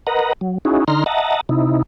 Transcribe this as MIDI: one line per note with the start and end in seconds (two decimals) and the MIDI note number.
0.07 0.33 70
0.07 0.33 71
0.07 0.33 75
0.07 0.33 78
0.07 0.33 82
0.41 0.58 54
0.65 0.84 61
0.65 0.84 63
0.65 0.84 64
0.65 0.84 66
0.65 0.84 68
0.88 1.04 50
0.88 1.04 63
0.88 1.04 82
0.88 1.04 84
0.88 1.04 89
1.06 1.41 75
1.06 1.41 76
1.06 1.41 78
1.06 1.41 81
1.06 1.41 82
1.49 1.82 48
1.49 1.82 63
1.49 1.82 64